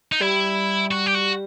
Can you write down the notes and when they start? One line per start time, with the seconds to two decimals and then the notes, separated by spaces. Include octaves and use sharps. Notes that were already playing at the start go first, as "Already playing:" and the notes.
0.12 D#4
0.20 G3 E4
0.91 F#4
1.06 G4
1.15 F#4